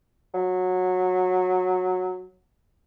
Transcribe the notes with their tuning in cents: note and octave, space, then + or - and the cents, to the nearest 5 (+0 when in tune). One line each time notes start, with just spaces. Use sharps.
F#3 -15